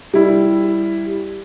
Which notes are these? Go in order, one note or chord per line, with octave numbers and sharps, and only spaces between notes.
G3 E4